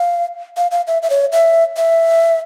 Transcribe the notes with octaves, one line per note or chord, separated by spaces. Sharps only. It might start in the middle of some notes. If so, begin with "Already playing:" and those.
Already playing: F5
F5
F5
E5
E5
C#5
E5
E5